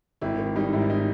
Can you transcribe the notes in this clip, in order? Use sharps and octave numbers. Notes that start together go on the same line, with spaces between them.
G#1 E4
D#3
G3 D#4
G#2 E4
D#4